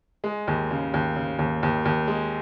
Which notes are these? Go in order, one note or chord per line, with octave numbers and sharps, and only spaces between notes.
G#3
D#2
C#3
D#2
C#3
D#2
D#2
D#2
G#3